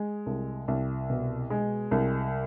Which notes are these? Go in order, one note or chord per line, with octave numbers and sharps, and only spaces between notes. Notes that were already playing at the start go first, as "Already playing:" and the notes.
Already playing: G#3
C2
C2
B2
G#3
C2